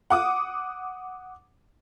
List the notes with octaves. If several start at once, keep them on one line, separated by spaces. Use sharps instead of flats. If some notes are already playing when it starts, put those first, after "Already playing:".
F#5 D6 D#6